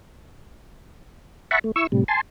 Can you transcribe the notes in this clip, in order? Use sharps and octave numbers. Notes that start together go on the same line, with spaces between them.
E5 F#5 A5 B5 C#6
A3
E4 C#6 E6
A2 C3 G3
G#5 A5 C6